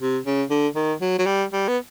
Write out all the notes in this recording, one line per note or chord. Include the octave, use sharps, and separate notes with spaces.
C3
C#3
D3
D#3
F#3
F#3
G3
G3
B3